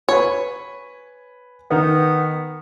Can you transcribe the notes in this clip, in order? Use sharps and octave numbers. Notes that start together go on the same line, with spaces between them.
B4 C#5 G#5
D#3 B3 D#4 A#4